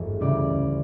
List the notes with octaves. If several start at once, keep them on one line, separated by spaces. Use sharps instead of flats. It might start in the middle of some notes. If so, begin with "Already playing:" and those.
Already playing: G#1 E2 G2 A3
D2 C#3 E3 G3 D5